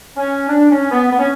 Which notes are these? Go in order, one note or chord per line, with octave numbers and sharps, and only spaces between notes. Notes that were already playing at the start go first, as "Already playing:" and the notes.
C#4
D4
C#4
B3
B3
C#4